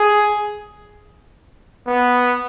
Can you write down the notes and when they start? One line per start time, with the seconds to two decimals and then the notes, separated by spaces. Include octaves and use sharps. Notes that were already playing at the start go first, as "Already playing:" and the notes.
Already playing: G#4
1.87 B3